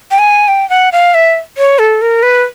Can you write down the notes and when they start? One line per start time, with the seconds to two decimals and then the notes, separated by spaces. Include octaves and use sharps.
0.11 G5
0.19 G#5
0.48 G5
0.70 F#5
0.92 F5
1.14 E5
1.58 C#5
1.79 A4
2.02 A#4
2.23 B4